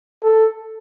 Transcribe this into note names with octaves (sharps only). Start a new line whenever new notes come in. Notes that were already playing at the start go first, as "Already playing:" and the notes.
A4